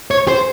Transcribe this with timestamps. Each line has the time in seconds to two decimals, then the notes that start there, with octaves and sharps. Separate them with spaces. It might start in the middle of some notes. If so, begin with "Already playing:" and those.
0.11 C#5
0.28 C5